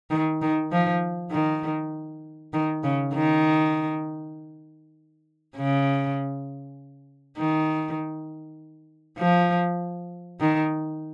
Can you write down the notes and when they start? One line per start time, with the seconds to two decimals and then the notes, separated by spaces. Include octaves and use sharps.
0.10 D#3
0.42 D#3
0.72 F3
1.31 D#3
2.53 D#3
2.84 C#3
3.14 D#3
5.56 C#3
7.38 D#3
9.19 F3
10.40 D#3